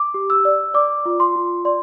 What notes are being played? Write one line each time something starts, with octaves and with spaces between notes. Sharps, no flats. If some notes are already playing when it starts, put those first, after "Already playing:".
Already playing: D6
G4
E6
D5
D5 D6
F4
C6
F4
D5 C6